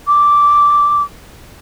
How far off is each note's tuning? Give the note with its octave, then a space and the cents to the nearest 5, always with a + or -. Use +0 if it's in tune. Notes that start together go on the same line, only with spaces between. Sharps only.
D6 -5